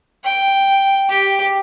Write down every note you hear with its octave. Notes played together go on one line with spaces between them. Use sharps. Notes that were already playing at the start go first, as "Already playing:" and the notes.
G5
G4